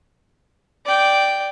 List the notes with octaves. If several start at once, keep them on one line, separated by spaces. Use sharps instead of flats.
D5 G5